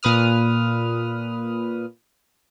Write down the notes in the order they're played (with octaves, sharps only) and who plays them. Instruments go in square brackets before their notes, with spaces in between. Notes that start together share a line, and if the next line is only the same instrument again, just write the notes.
[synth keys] A#2 B4 D#6 F6